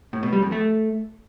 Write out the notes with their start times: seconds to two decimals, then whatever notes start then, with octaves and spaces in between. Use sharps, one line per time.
0.13 A2
0.23 B2
0.33 G3
0.42 F2
0.52 A3